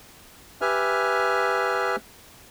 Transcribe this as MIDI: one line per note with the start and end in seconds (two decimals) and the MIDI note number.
0.61 1.96 67
0.61 1.96 71
0.61 1.96 76
0.61 1.96 80
0.61 1.96 89